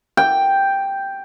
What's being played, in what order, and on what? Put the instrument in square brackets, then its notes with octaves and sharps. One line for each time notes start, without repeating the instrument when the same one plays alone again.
[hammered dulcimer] G5